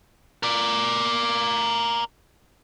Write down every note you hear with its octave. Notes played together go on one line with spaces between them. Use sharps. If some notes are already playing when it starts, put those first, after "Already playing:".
A#4 D5